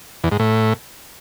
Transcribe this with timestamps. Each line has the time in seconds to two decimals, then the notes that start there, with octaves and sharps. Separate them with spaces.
0.24 E2
0.32 G#2
0.40 A2